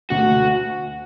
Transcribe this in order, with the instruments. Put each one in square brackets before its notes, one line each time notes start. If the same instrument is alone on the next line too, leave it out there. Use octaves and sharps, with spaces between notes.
[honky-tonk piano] D2 [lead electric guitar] F#4